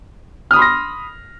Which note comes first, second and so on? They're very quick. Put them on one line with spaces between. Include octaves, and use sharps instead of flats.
F6 D#6 B5 C6 A#6